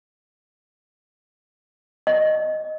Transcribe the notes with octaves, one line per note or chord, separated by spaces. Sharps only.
D#5